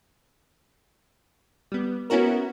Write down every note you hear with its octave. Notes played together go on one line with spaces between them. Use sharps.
G3 B3
B3 C#4 E4 F#4 A#4